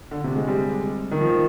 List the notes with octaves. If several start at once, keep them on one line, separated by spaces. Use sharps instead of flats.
D3
C3
G#3
G3
D#3
F3